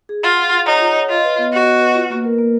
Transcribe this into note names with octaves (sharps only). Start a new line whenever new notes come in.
G#4
F4 F#5
F#5
F#5
D#4 C#5
F4
C#5
F4 D#5
B4
B3
F#4 D#5
D#5
B4
F4
A#3
A#4
A#3